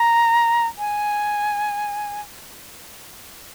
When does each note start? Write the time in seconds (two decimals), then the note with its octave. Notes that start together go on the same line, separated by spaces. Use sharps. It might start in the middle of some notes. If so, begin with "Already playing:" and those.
Already playing: A#5
0.78 G#5